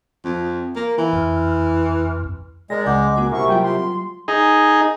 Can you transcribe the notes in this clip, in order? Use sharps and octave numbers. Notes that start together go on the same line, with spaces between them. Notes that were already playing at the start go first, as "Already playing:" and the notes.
F2
A#3
E3
F2
G#3 G#4 A#4 D5 A#6
C#2 F#5 D6 G6
A#3 F#4 G#5
C3 E4 A#4 F#5 C#6
F#3 G3 F4 G5
C6
D#4 G#4